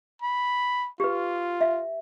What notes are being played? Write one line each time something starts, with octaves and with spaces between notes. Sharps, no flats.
B5
F4 G4 B4
E5